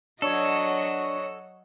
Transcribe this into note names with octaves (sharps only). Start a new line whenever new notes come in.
F#3 D4 F#4 A4 C#5 D#5